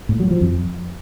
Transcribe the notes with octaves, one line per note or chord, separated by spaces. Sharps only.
A2
F#3
F3
F2